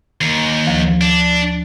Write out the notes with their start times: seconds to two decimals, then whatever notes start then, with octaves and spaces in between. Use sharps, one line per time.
0.21 D#2
0.67 D2 F3
1.01 D4